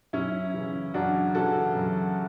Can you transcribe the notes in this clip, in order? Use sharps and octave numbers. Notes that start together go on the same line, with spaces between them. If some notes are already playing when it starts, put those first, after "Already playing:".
F#2 C#4 E4
C#3 E3
F#2 D4 F#4
C#3 E3 F#4 A4
F#2